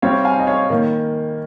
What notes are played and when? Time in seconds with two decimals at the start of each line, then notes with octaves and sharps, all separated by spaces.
0.02 C3 G3 C4 C#5 F5
0.25 F5 G#5
0.40 D#5
0.47 C#5 F5
0.70 D#3 A#3